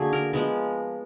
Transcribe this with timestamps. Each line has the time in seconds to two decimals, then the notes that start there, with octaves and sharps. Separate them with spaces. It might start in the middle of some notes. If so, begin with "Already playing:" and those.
Already playing: D3 F#3 A#3 F#4 G#4
0.13 A#4
0.33 F3 G#3 B3 A#4